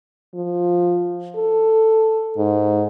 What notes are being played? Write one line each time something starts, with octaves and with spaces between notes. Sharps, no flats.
F3
A4
G#2